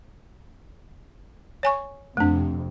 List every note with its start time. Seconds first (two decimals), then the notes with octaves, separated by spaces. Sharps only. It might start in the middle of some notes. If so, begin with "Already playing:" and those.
1.63 C#5 G#5 C#6
2.17 F2 C3 A3 D4